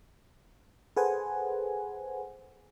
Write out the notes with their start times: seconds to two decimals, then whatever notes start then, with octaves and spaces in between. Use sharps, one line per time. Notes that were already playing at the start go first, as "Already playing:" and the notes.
0.96 G#4 A4 B4 C5 F#5 G#5